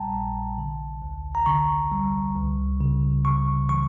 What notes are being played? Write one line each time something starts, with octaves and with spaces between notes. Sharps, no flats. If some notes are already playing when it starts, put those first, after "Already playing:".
Already playing: A#1 A#2 G3 G5 A5 A#5
A#1
D3
D2
A#5
D3 C#6
G3
C#2
C#3
C#3 C#6
E3 C#6